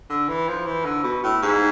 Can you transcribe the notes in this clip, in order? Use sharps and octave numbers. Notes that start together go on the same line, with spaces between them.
D3
E3
F3
E3
D3
B2
A2
G#2